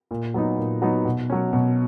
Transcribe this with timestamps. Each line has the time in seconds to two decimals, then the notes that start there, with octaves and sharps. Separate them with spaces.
0.11 A#2
0.34 F#3 B3 D#4
0.58 A#2
0.82 F#3 B3 D#4
1.05 B2
1.30 F#3 C#4
1.53 B2